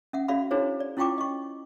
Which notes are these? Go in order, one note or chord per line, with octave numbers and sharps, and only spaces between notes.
C#4 E5 F#5
C#4 F#4 D5 E5 F5 B5
D4 E4 F#4 G#4 C5 C#5
D5
C#4 E4 F4 G5 C#6 D6
D#5 C#6